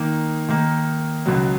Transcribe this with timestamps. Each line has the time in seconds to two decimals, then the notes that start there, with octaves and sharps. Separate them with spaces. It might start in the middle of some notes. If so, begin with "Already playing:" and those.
Already playing: D#3 A#3 D#4
0.49 D#3 A#3 D#4
1.26 C#2 B2 F#3